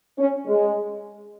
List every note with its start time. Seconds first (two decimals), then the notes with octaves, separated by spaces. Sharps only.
0.17 C#4
0.47 G#3